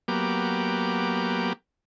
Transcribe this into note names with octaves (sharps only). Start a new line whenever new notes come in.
F#3 A#3 B3 G4 D6